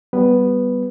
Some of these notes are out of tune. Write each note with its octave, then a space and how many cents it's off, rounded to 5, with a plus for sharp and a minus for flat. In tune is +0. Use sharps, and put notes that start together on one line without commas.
G3 -10 B3 +0 B4 +0